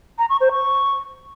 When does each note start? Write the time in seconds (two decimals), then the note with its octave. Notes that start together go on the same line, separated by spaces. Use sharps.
0.18 A#5
0.30 C#6
0.41 C5
0.52 C#6